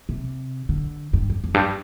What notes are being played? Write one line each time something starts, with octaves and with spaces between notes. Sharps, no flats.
C3
D3
G2
F2
F2
G2